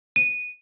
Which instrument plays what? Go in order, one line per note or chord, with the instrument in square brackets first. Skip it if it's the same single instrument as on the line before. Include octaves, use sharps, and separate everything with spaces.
[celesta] D#7